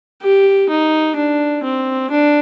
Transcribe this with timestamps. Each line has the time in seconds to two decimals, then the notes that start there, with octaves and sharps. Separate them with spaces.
0.22 G4
0.70 D#4
1.16 D4
1.63 C4
2.11 D4